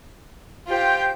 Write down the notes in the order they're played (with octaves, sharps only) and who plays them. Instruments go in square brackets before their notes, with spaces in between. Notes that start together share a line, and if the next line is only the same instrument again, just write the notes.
[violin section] F4 G5 [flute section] G4 C5 G6